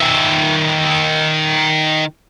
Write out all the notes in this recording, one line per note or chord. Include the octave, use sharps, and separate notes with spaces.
D#3 E5